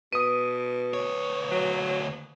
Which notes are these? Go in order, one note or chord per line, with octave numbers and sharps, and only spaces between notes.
B2 B4 D#6 D#7
D2 C#5
F#3